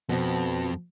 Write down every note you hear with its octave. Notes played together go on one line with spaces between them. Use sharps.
F2 B2 F3